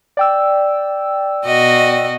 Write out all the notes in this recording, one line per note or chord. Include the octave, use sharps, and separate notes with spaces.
D5 G5 E6
B2 F#4 D#5